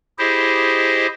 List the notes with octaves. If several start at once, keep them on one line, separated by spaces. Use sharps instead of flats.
E4 G4 G#4 C5 D#5